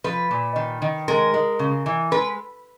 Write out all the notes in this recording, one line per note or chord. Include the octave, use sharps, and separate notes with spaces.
F3 B4
A#2
D#3
D#3
G#3 A#4
G#3
C#3
E3
G#3 B4